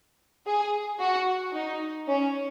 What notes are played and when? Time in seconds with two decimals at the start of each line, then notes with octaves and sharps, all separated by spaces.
0.46 G#4
1.00 F#4
1.54 D#4
2.08 C#4